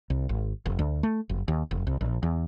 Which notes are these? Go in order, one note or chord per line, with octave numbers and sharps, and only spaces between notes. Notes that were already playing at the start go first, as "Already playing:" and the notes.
C2
G#1
F1
D2
A3
F#1
D#2
F1
C2
A#1
E2